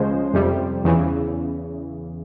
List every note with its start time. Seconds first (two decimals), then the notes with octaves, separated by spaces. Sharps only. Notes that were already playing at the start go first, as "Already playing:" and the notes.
Already playing: C#2 C#3 F3 G#3 C5
0.34 F2 C3 G3
0.84 E2 C#3 E3